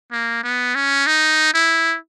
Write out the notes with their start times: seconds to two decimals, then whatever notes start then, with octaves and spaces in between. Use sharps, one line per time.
0.12 A#3
0.43 B3
0.75 C#4
1.07 D#4
1.54 E4